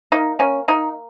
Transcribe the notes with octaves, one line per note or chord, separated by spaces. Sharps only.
A#3 D#4
A#3 C#4
A#3 D#4